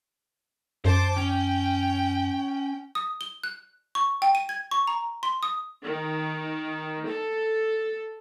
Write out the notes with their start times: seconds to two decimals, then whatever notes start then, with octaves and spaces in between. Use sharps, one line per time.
0.85 F#2 C5 A5 C6 D6
1.17 C#4 G5
2.95 D#6
3.21 G7
3.43 F#6
3.95 C#6
4.22 G5
4.35 D#7
4.49 G#6
4.71 C#6
4.87 A#5
5.23 C6
5.43 D#6
5.84 D#3
7.06 A4